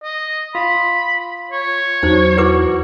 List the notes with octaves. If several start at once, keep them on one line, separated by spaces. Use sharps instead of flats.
D#5
F4 B5
C#5
E2 F#3 D#4 C5
E4 F#4 B4 D6